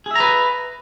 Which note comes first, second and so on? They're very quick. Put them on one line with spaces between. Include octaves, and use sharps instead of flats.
G#4 E5 A#5 B4